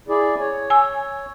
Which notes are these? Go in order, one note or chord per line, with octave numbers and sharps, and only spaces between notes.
E4 G#4 D5
C#5
G#5 E6